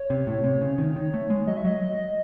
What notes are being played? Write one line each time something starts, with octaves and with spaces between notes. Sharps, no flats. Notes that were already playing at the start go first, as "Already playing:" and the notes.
Already playing: C#5
C3
A2
C3
C#3
D#3
D#3
A3
G#3
F#3 D#5
E5
F#3 D#5